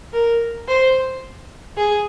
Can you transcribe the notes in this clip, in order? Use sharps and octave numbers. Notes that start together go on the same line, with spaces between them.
A#4
C5
G#4